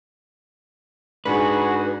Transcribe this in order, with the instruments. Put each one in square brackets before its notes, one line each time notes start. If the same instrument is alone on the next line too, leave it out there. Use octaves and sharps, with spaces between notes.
[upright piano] G#2 D4 [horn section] F#4 G#4 [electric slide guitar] B4